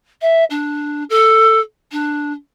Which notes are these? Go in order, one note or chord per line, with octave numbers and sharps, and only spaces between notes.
E5
D4
A4
D4